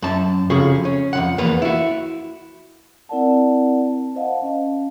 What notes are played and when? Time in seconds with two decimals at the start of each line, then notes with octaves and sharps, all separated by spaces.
0.02 F#2 A5
0.50 F2 C#3 F#4 G#4
0.85 C#4
1.13 F2 C#3 F#5
1.38 E2 A#3 B3
1.62 E4 F#4
3.09 C4 E4 A#4 D5 F#5 A5
4.15 C5 D#5 F5 F#5 A5
4.42 C#4